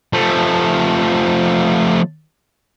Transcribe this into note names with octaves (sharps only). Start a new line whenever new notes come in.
F3 A3